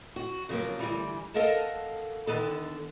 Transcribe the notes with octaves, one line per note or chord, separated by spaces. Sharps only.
F#4
C#3 F3 F#3 A#3
D2 G#2 E3 G3
A4 A#4 D#5 F5 F#5 A5
D3 D#3 B3 A4